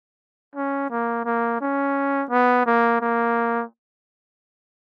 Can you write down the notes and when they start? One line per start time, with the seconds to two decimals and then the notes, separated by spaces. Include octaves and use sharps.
0.55 C#4
0.90 A#3
1.25 A#3
1.61 C#4
2.30 B3
2.66 A#3
3.01 A#3